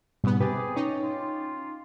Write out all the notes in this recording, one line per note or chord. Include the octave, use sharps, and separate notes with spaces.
G#2 B2 G3 B3
C3 G#4 B4 G5 D6 A6
C#4 D#4
F4